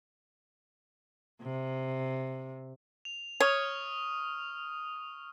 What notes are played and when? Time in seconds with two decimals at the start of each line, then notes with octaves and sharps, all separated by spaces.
1.42 C3
3.05 F7
3.40 C#5 C#6 D#6 F6